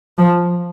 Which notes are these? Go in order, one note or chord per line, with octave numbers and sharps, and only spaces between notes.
F3